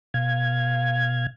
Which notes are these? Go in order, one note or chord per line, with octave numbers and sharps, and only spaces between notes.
B2 F5 G#6